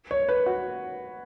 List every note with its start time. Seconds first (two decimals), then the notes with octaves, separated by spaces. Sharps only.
0.11 C#5
0.29 B4
0.46 F#4